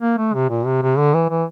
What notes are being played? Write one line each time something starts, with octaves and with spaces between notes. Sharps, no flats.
A#3
A3
C3
A#2
C3
C3
D3
E3
E3